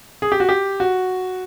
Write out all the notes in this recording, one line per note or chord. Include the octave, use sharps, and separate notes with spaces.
G#4
G4
F#4
G4
F#4